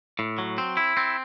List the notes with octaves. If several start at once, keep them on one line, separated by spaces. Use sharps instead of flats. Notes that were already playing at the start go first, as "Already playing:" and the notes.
A2
F#3
C4
E4
C4